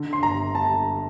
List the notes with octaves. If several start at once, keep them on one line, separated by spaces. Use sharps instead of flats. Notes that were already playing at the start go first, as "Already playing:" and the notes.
Already playing: D3
C6
G1 A#5
G1 A5